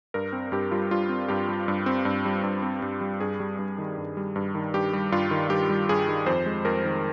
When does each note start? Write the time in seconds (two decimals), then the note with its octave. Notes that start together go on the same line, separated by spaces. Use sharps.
0.14 G2 A#4
0.33 C4
0.52 G2 G4
0.71 G3 F4
0.91 G2 F4
1.09 C4
1.29 G2 G4
1.49 G3
1.68 G2
1.86 C4
2.05 G2
2.25 G3
2.43 G2
2.62 C4
2.82 G2
3.01 G3
3.20 G2 G#4
3.40 G3
3.59 G2
3.78 D#3
3.98 G2
4.17 G3
4.36 G2
4.55 D#3
4.74 G2 G4
4.93 G3
5.12 G2 F4
5.31 D#3
5.50 G2 G4
5.69 G3
5.89 G2 G#4
6.08 D#3
6.26 F2 C5
6.46 G#3
6.65 F2 A#4
6.85 D#3